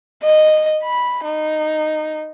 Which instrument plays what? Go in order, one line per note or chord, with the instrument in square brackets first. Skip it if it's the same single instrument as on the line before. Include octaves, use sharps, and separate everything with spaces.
[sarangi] D#5
B5
D#4